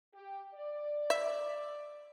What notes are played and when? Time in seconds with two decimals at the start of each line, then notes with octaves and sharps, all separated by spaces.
0.14 G4
0.55 D5
1.10 E5